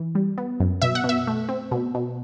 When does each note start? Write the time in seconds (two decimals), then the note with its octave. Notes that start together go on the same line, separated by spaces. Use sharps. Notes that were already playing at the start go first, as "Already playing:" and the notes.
Already playing: E3
0.15 G3
0.38 B3
0.60 F#2
0.82 B2 E5
0.95 F#5
1.04 B2
1.09 E5
1.27 A3
1.49 C4
1.71 B2
1.95 B2